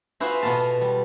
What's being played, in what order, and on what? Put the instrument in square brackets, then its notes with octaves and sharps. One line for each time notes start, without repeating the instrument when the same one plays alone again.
[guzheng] F4 F#4 G#4 B4 C5 E5
B2 B3 A4 F5 A5
G3